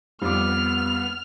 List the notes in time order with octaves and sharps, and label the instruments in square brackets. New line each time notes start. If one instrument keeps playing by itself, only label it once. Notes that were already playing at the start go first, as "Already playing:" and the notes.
[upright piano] F2 D6 [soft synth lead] G3 [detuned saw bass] B3 [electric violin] F6